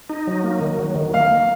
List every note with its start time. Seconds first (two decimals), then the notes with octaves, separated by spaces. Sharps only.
0.10 D#4
0.27 F#3
0.44 A#3
0.61 D#3
0.79 F#3
0.96 D#3
1.14 A#3 F5
1.30 A#3